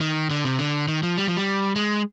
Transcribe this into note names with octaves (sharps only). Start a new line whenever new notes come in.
D#3
D3
C3
D3
D#3
F3
G3
F3
G3
G#3